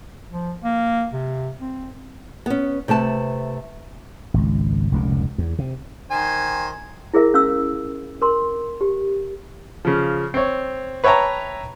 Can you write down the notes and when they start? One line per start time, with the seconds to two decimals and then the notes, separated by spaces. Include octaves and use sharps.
0.31 F3
0.64 A#3
1.13 C3
1.58 C4
2.46 B3 C#4
2.88 C3 A3 B4 A5
4.34 G#1 C#2
4.92 F1 C#2 A#2
5.38 E2
5.59 C3
6.11 D#3 C5 G#5
7.14 E4 G#4 A#4 E5
7.34 C#4 F5 E6
8.22 A#4 C6
8.81 G4
9.85 C#3 F3
10.34 C4 C#5
11.04 B4 C#5 E5 G5 A5 A#5